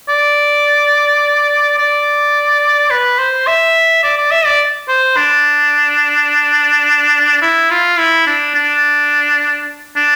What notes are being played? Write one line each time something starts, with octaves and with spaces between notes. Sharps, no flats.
D5
D5
B4
C5
E5
D5
D5
E5
D5
C5
D4
E4
F4
E4
D4
D4
D4